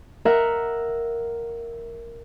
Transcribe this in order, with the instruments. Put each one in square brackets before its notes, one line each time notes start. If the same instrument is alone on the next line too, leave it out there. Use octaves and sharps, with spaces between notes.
[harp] A#4 E5 F#5